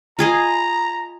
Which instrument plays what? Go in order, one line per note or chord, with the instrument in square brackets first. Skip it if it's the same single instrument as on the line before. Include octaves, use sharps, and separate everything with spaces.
[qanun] F4 G#4 D#5 [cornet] A#5